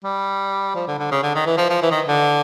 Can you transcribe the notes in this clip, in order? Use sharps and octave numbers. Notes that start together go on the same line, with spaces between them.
G3
F3
D3
D3
C#3
D3
D#3
E3
F3
F3
E3
D#3
D3